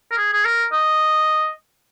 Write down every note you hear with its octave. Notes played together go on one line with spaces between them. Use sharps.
A#4
G#4
G#4
A#4
D#5